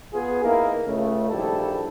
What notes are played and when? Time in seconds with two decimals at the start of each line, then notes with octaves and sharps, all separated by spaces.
0.14 B3 F4 G#4
0.43 A#3 B3 D#4 E4 A#4
0.86 C#2 C#3 A3
1.31 A#1 D#2 G3 E4 A4